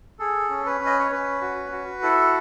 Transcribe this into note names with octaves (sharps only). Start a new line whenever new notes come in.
G#4 A4
C#4
B4
C#4
D#5
C#5
C#4 B4
F#4
F#4
E4 A4